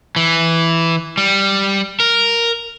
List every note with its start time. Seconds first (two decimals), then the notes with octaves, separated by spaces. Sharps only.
0.16 E3
1.18 G3
2.00 A#4